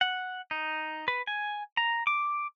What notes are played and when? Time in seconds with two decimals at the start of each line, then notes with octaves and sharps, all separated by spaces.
0.01 F#5
0.51 D#4
1.08 B4
1.27 G#5
1.77 A#5
2.07 D6